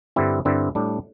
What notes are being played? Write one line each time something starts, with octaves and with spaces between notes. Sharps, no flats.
G2 D3 G3 C4 E4
G2 D3 G3 C4 E4
A2 G3 D4